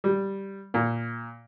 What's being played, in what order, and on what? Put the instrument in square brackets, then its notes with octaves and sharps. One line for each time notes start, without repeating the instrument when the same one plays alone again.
[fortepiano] G3
A#2